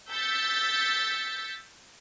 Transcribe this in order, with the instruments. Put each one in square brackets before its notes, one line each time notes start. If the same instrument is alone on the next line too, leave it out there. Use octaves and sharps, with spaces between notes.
[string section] E6 G6 A6 B6 C#7